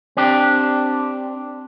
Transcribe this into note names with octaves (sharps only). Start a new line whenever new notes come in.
C4 D4 G4